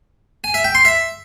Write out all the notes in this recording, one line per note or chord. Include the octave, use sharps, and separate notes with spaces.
G#5
E5
G5
C6
E5